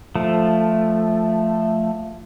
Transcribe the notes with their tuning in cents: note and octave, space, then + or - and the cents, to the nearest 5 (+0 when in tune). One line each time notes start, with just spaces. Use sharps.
F3 +0 A3 +0